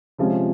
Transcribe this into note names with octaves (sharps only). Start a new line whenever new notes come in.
C3 F3 G#3 C#4 F4